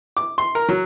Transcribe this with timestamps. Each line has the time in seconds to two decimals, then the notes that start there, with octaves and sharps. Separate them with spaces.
0.17 D6
0.38 C6
0.55 A#4
0.69 F#3